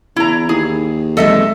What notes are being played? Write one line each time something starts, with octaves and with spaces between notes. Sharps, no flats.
E2 E4 A#5
D#2 G#4
E2 C3 G#3 A4 D#5 E5